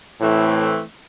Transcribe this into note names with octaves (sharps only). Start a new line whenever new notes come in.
A2 E3 A3 C4